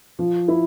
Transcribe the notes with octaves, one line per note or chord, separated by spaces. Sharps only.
F3
E4